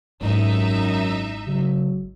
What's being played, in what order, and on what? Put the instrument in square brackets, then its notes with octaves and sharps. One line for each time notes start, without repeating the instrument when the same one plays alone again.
[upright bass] G#1 E4 [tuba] F#2 [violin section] D#4 E5
[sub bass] C#3 [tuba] F#3